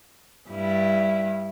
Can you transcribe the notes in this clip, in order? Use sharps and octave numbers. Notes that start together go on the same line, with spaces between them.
G2 G3 E4